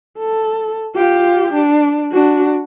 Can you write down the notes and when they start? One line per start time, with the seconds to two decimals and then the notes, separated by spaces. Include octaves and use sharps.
0.18 A4
0.95 F4 G4
1.53 D4
2.12 D4 F#4